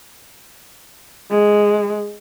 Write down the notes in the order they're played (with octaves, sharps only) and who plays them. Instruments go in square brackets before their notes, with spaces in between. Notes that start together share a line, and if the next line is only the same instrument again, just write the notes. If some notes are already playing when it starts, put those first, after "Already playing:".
[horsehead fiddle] G#3